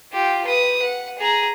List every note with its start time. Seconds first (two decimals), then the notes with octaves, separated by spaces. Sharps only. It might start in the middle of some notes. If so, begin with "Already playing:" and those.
0.12 F4 G4
0.45 B4 D#6
0.82 F#5
1.19 G#4 A#5